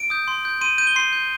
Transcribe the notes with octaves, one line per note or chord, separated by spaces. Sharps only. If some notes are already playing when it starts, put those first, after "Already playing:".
Already playing: D7
D#6 G6
C6
G6
C6 D#7
G6 D#7
G7
C6 C7
G6